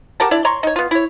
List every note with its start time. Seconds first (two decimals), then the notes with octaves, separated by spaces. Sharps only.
0.20 G4 A#4 F#5 A5
0.31 D4 E4 D5
0.45 C#5 A#5 C6 C#6
0.63 D#4 C#5
0.76 B3 F4
0.91 E4 C#5